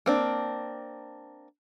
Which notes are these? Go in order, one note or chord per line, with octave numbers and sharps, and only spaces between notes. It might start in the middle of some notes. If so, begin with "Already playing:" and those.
A#3 C4 D4